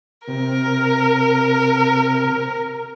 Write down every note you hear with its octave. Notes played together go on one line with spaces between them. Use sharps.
C3 A#4